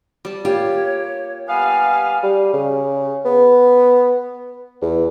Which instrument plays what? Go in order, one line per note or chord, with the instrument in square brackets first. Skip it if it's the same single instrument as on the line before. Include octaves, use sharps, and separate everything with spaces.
[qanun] G3 A5
[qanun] A#3 F4 [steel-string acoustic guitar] G4 [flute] C#5
[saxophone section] G3 B3 F5 [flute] G#5
[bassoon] G3
C#3
B3
E2